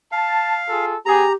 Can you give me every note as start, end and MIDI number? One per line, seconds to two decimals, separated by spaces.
0.12 0.85 77
0.12 0.59 81
0.69 0.94 65
0.69 0.94 68
0.69 0.94 69
1.06 1.26 59
1.06 1.34 67
1.06 1.26 68
1.06 1.33 82